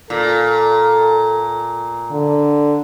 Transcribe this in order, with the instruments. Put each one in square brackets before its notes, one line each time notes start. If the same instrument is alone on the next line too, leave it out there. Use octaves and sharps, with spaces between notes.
[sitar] A#2 [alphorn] A4
[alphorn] D3